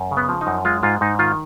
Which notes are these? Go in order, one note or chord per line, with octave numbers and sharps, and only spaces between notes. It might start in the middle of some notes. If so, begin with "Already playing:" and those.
Already playing: F#2
C#3
B3
F3
D#4
F#2
G#3 F4
G#2 F4
G#2 D#4
D#3 F4